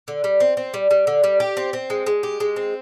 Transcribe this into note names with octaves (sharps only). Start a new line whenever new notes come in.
D3
G3
C4
C4
G3
G3
D3
G3
G4
C4
C4
G#3
G#3
G4
G#3
C4